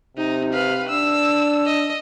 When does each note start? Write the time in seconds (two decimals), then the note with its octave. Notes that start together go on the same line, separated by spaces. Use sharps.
0.17 C3 D#4
0.53 B4 F5
0.89 D4 E6
1.66 D#5